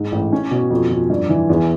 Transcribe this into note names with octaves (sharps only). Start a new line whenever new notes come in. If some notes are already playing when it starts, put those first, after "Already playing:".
Already playing: G#2
A1
C#4
B2
F2
F2
G2
E3
E2